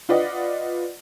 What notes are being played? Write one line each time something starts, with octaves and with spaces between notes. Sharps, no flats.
F4 B4 D5 D#5 F#5